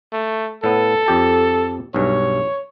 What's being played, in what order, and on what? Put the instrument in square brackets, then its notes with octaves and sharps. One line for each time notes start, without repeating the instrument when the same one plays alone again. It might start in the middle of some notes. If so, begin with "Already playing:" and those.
[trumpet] A3
[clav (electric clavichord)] A2 B3 [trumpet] A4
[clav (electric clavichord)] F2 G4 A5
[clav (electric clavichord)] B1 G2 [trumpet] C#5